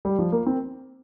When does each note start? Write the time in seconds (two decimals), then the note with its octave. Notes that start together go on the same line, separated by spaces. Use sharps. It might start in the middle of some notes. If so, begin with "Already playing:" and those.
0.05 G3
0.19 F3
0.32 A#3
0.46 C4